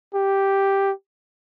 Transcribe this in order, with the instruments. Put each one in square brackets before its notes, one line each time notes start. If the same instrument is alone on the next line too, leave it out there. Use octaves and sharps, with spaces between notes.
[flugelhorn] G4